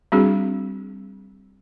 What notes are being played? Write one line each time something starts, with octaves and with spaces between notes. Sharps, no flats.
G3 C4 D4 F#4 G#4